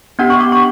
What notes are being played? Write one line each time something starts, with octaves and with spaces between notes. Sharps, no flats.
B3 D4 G4 F#5
C#6
D6
C#6